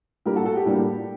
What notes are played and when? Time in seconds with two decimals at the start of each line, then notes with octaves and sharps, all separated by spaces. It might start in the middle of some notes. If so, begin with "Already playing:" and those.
0.26 A2 G3 A#3 D4 G4 A#4
0.35 F#4 A4
0.45 F#4 A4
0.56 G4
0.66 A2 G3 A#3 D4